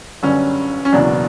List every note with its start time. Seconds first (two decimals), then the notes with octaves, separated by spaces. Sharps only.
0.23 G1 F#2 D3 G3 C#4
0.85 C#4
0.92 F#1 E2 B2 F#3 D4